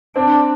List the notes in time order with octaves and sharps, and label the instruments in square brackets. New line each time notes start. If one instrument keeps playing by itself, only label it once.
[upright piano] C4 [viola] D4